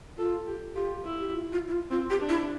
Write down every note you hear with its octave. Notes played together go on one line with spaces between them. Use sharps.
F4 A4
G4
F4 G4
E4
G4
F4
F4
E4
F4
C4 F4
G4
D4
E4